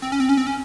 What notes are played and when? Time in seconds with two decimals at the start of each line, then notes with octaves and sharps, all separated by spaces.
0.02 C4
0.12 C#4
0.20 C4
0.29 C#4
0.37 C4
0.47 C#4